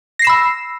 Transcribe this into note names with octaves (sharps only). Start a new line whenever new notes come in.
B5 E6 A#6 C7 E7